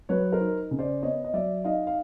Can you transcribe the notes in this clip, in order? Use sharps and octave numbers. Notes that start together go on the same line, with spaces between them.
F#3 B4 C#5
A#4 C5
D#4
C#3
C5 D5
B3 C#5 D#5
D#5
F#3 D5 E5
D#4 D#5 F5
F5